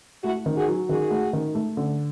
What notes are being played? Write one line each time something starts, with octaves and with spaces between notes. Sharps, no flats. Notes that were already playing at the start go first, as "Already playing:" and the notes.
A3 E4 F#4
D#3
F#4 G#4
F#3
D#3 F#4 G#4
A3
D#3
A3
D3